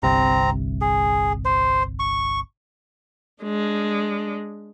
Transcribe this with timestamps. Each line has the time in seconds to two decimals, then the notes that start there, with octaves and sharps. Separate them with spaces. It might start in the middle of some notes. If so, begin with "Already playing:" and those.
0.03 G1 C2 C3 C4 A#5
0.81 G#4
1.45 C5
1.99 C#6
3.43 G#3 D4